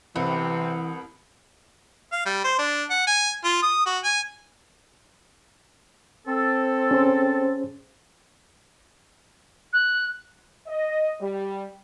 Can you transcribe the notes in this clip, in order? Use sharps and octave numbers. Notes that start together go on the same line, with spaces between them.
C2 C3 E3 B3 C4
F5
G3
C5
D4
F#5
G#5
F4
D#6
F#4
G#5
C4 A4
C#4 G#4 C5
F#6
D#5
G3